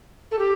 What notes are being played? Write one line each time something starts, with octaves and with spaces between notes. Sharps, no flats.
A4
G4